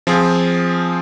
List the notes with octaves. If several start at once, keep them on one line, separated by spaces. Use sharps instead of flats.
F3 C4 F4 G#4